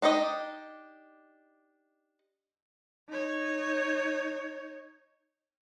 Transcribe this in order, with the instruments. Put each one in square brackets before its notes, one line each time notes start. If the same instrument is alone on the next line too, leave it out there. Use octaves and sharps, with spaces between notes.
[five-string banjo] D4 D#4 G4 D#5
[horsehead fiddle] D#4 C#5